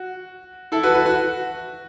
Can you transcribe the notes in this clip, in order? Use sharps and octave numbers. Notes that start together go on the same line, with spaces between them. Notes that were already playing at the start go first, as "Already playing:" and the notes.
Already playing: F#4
E4 A4
F#4 B4
F#4 B4
F#4